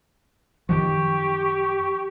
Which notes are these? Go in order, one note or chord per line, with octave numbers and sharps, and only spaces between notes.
F#2 D#3 F3 G4 C#6